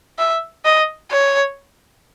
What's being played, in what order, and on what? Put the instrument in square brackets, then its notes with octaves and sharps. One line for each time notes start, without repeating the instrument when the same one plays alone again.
[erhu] E5
D#5
C#5